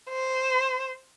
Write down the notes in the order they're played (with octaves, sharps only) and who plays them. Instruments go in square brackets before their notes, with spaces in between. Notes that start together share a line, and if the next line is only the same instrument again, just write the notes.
[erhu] C5